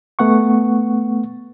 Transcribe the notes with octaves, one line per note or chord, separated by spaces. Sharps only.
A3 B3 F#5 C#6